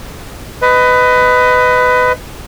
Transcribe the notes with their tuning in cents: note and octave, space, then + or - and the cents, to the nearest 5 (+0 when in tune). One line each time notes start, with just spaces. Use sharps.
B4 +20 D#5 +0